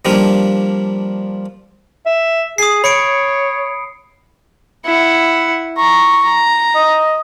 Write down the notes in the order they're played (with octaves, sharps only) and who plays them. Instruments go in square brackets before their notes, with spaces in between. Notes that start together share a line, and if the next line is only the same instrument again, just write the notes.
[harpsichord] F3 G3 A#3 D4
[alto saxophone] E5
[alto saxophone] G#4 [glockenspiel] D#6 C7
[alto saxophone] C#5 [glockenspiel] B5 C#7 D7
[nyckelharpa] E4 F#5
[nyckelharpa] A#5 [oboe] C#6
[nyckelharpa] A#5
[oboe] D#5